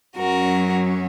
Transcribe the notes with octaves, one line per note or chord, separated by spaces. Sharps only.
F#2 F#3 C#4 F#4 A#4